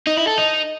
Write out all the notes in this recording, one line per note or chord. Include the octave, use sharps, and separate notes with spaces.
D#4
E4
A4
D#4